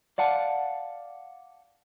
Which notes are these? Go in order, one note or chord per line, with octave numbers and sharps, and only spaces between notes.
D5 F5 F#5 A5